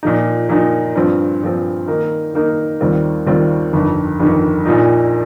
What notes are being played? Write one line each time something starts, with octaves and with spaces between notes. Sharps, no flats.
A#2 F3 D#4
A#2 F3 D#4
G2 F3 C4
G2 F3 C4
D#3 A#3 D#4
D#3 A#3 D#4
D#2 D#3 G3 C4 F4
D#2 D#3 G3 C4 F4
G1 F2 D#3
G1 F2 D#3
A#1 A#2 F3 D#4